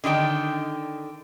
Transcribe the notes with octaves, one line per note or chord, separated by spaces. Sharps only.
D3 D#3 F#4 G5 A5